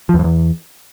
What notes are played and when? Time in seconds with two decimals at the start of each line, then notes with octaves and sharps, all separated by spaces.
0.09 F3
0.14 E2
0.19 F2
0.24 E2